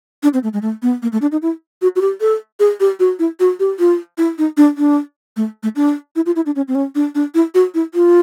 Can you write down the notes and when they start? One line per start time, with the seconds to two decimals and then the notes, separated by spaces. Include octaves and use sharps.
0.23 D4
0.34 C4
0.43 A3
0.53 G#3
0.62 A3
0.82 B3
1.02 A#3
1.12 A3
1.22 D4
1.32 D#4
1.42 E4
1.82 F#4
1.96 F#4
2.01 G4
2.21 A4
2.60 G#4
2.80 G4
3.00 F#4
3.19 E4
3.40 F#4
3.60 G4
3.79 F4
4.18 E4
4.38 D#4
4.57 D4
4.78 D4
5.37 A3
5.63 A3
5.76 D4
6.16 E4
6.26 F4
6.36 E4
6.46 D4
6.56 C#4
6.68 C4
6.75 C#4
6.95 D4
7.15 D4
7.34 E4
7.55 F#4
7.74 E4
7.94 F4